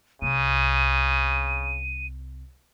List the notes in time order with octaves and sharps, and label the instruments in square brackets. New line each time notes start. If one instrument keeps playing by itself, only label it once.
[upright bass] C2 [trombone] C#3 [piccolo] D#7